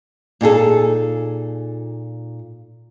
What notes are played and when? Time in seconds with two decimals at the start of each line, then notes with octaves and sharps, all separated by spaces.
0.41 A#2 D#4 G#4 A4